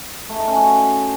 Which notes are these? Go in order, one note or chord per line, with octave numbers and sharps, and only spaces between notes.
A3
D#4
C#4
F#4